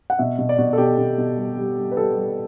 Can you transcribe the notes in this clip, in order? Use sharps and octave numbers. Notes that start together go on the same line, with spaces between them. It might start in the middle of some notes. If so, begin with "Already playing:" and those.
F#5
B2 E5
B2
D5
B2
A4
B2 G4
B2
B2
G3
G3
G3
B4
G3 A4
G3